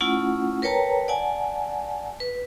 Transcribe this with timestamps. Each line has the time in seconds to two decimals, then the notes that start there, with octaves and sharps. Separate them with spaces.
0.01 A3 C#4 E4 F4 F#5
0.62 A#4 B4 C#5 G5 A5 A#5
1.08 D5 F#5 G#5 A5
2.20 B4